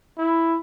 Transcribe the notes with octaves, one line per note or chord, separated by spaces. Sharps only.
E4